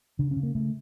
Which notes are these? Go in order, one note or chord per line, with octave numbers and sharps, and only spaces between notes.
C#3 D4
C#4
C#3
A#3
C#3 A3